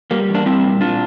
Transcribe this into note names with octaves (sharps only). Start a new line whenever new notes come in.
G3 A#3
E2
A#3 D4
G3 C4 E4
A#2
A#2 D4 F4